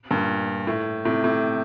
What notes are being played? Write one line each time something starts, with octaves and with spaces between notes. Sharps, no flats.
G2 A#2
A2
A2 C3
A2 C3